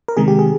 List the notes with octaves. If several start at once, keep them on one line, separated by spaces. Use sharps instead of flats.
A#4
C3 D#3 G#3 G#4
G4
G#4